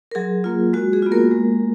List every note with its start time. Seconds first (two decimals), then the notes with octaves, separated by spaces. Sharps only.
0.11 A#4
0.15 F#3 G#4
0.44 A#3 F4
0.73 G#3 F#4
0.93 G#4
1.02 B3 F4
1.11 A#3 A#4
1.31 G#3